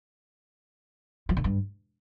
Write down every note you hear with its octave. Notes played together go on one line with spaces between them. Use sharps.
F3
D3
G2